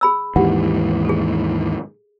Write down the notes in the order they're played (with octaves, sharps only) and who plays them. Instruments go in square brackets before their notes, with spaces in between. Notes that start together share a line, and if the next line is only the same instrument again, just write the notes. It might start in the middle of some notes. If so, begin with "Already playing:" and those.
[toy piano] G#4 B5 E6
[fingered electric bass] D#2 G#2 E3 [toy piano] G4 F#5
[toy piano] G#4 A4